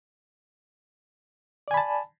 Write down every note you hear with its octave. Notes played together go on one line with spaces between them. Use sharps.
D5 G#5 A5 B5